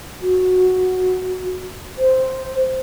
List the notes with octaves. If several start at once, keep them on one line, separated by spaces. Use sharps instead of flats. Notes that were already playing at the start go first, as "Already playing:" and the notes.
F#4
C5